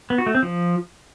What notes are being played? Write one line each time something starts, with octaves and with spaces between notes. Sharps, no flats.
B3
F#4
A3
C4
F3